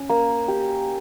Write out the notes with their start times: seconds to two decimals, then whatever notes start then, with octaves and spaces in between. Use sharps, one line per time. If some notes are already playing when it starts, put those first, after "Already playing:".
Already playing: C#4
0.10 A#3
0.48 G4